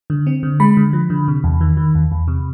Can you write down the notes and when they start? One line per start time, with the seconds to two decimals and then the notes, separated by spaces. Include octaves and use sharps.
0.10 D3
0.27 C4
0.43 D3
0.60 G#3 B5
0.77 D3
0.93 F3
1.10 D3
1.28 C3
1.44 E2
1.61 D#3
1.77 D#3
1.95 E2
2.12 E2
2.28 C3